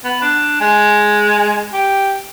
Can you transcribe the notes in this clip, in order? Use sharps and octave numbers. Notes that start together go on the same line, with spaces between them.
B3
D4
G#3
G4